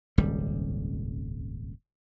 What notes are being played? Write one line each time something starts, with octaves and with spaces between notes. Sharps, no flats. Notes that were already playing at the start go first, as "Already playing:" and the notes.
D#1 G#1 C#2 G3